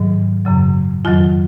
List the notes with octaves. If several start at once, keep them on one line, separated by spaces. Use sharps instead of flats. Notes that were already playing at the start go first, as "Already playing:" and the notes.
Already playing: G#2 D#3 F#3
F#2 C#3 F#3
F2 D#3 F#3 F4